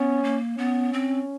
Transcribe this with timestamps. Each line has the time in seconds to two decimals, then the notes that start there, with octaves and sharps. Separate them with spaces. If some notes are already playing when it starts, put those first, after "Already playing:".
Already playing: B3 C#4
0.24 A#3
0.57 B3 C#4
0.93 C4